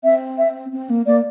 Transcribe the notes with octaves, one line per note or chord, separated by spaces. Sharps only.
C4 E5
E5
C4
A#3
A#3 D5